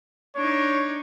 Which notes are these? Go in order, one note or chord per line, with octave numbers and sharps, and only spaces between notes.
D4 D#4 C#5